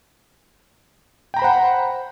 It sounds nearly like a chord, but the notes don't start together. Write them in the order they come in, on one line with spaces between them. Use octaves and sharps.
G5 A#5 B5 C5 F#5